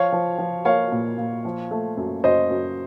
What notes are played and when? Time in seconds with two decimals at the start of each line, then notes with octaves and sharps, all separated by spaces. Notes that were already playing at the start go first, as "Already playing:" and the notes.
Already playing: F3 C#5 F5
0.12 F3
0.38 F3
0.65 A#3 C#5 F5
0.92 A#2
1.18 A#2
1.45 F3
1.71 A3
1.97 F#2
2.24 F#2 C5 D#5
2.50 F#2